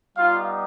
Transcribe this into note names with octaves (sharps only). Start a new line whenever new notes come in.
G3 B3 D#4 F4 F5